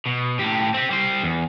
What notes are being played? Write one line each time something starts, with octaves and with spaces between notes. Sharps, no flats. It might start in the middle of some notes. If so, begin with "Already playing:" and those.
B2
A2 G4
C4 G4
G3 C5
E2